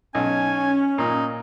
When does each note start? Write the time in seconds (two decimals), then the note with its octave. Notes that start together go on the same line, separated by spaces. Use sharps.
0.15 B1 C#4 G#5
0.98 A#2 D#4